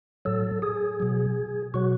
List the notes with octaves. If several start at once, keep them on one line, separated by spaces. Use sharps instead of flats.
A2 F#3 A4
G#4
B2 F#3
B2 F#3 F#4